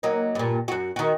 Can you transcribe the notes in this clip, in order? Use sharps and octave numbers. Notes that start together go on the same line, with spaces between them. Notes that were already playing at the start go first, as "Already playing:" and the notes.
F#3 A#3 D#4
G2 A#2
F#2 F#4
D#3 F#4